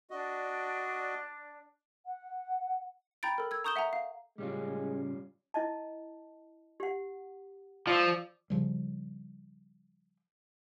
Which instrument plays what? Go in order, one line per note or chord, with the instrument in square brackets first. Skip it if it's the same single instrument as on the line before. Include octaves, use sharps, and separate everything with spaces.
[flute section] D4 D5 [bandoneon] F#4 D#5
[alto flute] F#5
[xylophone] G5 A#5 B5 G6 A6 D7
A4 A#4
E6 G#6
A#5 C#6 D#6 G6 E7 G7
E5 F#5 G#5 A#5
F5
[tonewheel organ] A2 C#3 [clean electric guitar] G3 C#4 F4 [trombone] G#3
[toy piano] E4 D#5 A5
G4 F#5
[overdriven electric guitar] F3 [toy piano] D5 D6 E6
[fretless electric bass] C#3 F3 G3